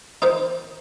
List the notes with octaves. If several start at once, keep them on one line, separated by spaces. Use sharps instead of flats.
D#4 F4 C5